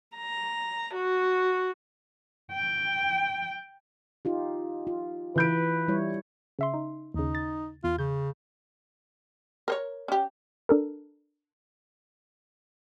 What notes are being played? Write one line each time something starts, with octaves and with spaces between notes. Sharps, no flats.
A#5
F#4
G5
D#4 F4 G4
F4
E3 B4 G6 D7
G3 E4 C#5
C#3 E5 C6
D#4
D#2 C#3 D#4
A6
E2 F4
C#3 G6
A#4 C5 C#5
C#4 G4
D4 A4 A#4